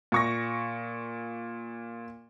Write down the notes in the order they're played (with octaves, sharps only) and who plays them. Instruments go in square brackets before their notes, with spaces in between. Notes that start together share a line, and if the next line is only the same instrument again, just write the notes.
[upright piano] A#2 C#6 A#6